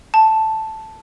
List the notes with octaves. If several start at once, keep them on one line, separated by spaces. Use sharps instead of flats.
A5